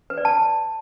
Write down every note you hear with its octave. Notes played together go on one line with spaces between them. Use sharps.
B4
D5
A5